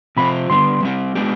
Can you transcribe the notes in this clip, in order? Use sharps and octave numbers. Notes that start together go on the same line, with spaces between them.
C3 F3 C4 F4 B5
D3 G3 B3 C6
G3 C4 G4
G#3 B3 D4 G4